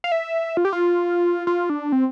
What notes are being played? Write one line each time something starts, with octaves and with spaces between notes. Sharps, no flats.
F5
E5
F4
G4
F4
F4
D4
C4